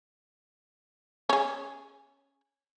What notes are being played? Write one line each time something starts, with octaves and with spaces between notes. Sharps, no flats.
C#4 G#4